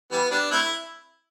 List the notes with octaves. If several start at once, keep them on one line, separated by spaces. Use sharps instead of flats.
E3 G3 B3
G3 B3 D4
A3 C4 E4